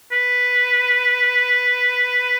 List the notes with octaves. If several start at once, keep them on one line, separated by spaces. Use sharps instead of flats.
B4